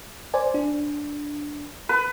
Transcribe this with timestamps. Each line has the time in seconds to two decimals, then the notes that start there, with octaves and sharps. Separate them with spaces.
0.34 C5 D5 G#5
0.54 D4
1.89 B4